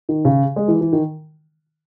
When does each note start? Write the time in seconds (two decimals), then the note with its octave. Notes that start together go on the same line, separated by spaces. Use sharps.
0.09 D#3
0.25 C#3
0.56 G#3
0.68 E3
0.81 E3
0.93 D#3